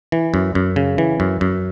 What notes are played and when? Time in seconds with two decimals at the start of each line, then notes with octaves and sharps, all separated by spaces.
0.12 E3
0.34 F#2
0.55 F#2
0.76 C#3
0.98 E3
1.20 F#2
1.41 F#2